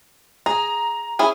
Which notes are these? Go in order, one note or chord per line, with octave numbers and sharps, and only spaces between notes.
G#4 A#5
C#4 E4 G#4